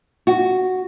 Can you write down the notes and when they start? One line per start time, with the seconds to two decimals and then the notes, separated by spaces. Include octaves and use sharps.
0.27 F#4